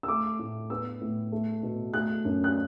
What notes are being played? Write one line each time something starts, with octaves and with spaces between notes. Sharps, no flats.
E6
A3 D6
A2
B3 E6
A2
A3
B2
A3 F#6
F#2
F#6